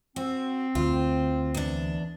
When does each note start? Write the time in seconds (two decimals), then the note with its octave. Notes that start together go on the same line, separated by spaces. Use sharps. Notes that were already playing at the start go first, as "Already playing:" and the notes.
0.16 C4 F#4
0.75 D2 F4
1.54 E2 D4